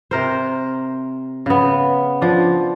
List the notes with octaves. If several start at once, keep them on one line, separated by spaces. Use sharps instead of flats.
C3 A#4 C5
C#3 B3
F3 D4